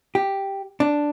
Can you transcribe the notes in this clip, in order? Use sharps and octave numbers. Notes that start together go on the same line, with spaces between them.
G4
D4